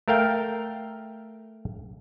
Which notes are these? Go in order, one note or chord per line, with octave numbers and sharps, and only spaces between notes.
A3 A#4 F5 G5